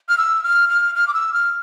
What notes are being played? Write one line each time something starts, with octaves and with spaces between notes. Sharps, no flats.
F6
E6
F6
F6
F6
D6
E6
F6